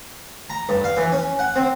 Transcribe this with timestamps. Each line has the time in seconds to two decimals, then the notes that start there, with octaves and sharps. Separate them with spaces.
0.50 A#5
0.69 G2
0.84 F5
0.97 E3
1.12 C#4
1.39 F#5
1.56 C4